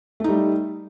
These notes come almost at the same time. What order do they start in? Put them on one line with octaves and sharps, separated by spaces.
A3 D#4 G3